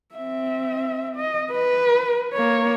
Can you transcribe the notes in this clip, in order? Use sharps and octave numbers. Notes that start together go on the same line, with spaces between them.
C4 E5
D#5
B4
A#3 C#5